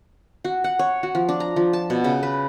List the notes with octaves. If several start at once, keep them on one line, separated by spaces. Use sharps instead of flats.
F#4
F#5
C#5
F#4
F3
D4
A#5
F3
A5
B2
C#3
B4